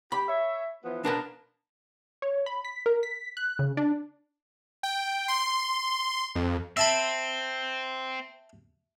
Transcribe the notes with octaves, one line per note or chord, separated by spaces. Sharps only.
G4 B5
C#5 E5
E3 F3 B3
B3 D4 A#4 B4 A5
C#5
B5
B6
A#4
B6
F#6
C#3
D4
G5
C6
F2
C4 E5 A5 B5